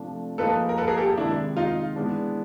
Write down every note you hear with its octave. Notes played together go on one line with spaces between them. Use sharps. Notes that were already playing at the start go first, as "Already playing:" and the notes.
Already playing: C3 F3 A3 D4
F3 A#3 D#4 G#4 A4 B4
A#4
A4 B4
G#4 A#4
G4 A4
C3 D#3 G#3 D4 E4
D#4 F4
E3 G#3 B3 D4